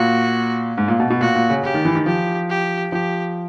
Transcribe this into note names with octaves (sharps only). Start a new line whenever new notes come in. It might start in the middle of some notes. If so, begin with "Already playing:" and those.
Already playing: A#2 F#4
G#2
A#2
B2
B2
A#2 F#4
A#2
C#3
C#3 G4
D#3
E3
D#3
F3 G4
G4
F3 G4